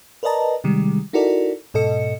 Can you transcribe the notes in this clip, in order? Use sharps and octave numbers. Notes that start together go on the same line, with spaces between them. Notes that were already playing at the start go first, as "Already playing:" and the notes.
A#4 B4 D5 D#5 A5 A#5
C3 D#3 G3 G#3
D#4 E4 F#4 A4 A#4 D5
G#2 B2 A4 D#5 C#7